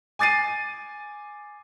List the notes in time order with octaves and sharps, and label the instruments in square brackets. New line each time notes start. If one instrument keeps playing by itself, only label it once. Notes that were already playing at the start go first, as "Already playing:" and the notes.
[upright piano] G#5 D6 A6 C7 D#7